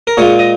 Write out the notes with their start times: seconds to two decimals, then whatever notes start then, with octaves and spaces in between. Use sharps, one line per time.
0.07 A#4
0.17 A#2 G#3 F4 G#4 C#5
0.39 D#5